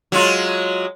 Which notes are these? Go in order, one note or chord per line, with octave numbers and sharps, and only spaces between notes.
F#3 G#3 F4